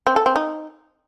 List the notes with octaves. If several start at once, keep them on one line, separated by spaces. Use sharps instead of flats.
C4
A4
C4
D#4